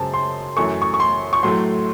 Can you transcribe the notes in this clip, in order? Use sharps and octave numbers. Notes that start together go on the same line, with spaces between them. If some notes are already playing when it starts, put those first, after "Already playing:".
Already playing: F#2 C#3 G#3 C5 A5
C6
F#2 E3 A3 C#6
C#6
C#6
C6
C#6
A2 F#3 A3 C6